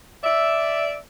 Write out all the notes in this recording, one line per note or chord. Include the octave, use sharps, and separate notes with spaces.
D5 E5